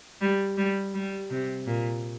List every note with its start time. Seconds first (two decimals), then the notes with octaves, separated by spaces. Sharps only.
0.21 G3
0.58 G3
0.95 G3
1.30 C3
1.67 A#2